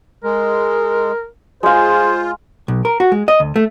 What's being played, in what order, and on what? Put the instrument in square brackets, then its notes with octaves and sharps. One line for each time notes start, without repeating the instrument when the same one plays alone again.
[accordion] G#3 [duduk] A#4
[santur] G#3 F5 [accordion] F4 [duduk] G#4 [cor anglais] C5
[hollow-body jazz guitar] B1
A#4
F#4
G#3
D#5
D2
A3